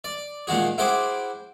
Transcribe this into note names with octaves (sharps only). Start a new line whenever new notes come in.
D5
A#2 D#3 G#3 F#4 G#4
E4 F#4 G#4 C5 G5 D6